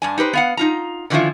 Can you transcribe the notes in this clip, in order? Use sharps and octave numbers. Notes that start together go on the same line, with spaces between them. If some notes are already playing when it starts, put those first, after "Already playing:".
G2 D4 G#5
D#4 G4 B4 C5
B3 F5 F#5
D#4 F4 A#5
D3 D#3 F3 C#4 E4 F4